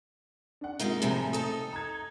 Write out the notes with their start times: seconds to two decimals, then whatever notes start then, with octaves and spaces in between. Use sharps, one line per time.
0.61 D4 F#5
0.79 G#2 C3 G#3 A#3 D#4 F4
1.02 A2 C3 F3 G#3 G#5 A#5
1.33 D#4 A4 D#6
1.73 A#5 G#6